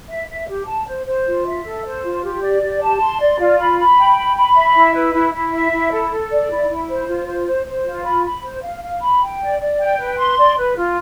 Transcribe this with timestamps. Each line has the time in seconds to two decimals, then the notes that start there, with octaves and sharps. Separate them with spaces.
0.09 E5
0.29 E5
0.48 G4
0.68 A5
0.87 C5
1.06 C5
1.26 F4
1.45 E5
1.64 A4
1.84 C5
2.04 F4
2.23 G4
2.42 D5
2.61 G4
2.81 A5
3.00 C6
3.20 D5
3.39 F4
3.58 B5
3.78 B5
3.98 G5
4.17 B5
4.36 B5
4.55 E5
4.75 E4
4.94 B4
5.13 E4
5.33 E4
5.52 E5
5.72 E4
5.91 A4
6.11 A4
6.30 D5
6.50 E4
6.69 E4
6.89 C5
7.08 F4
7.27 C5
7.46 C5
7.66 C5
7.85 F4
8.04 B5
8.24 B5
8.43 C5
8.63 F5
8.82 F5
9.02 B5
9.21 G5
9.41 D5
9.60 D5
9.79 G5
9.98 B4
10.18 C6
10.37 D5
10.57 B4
10.76 F4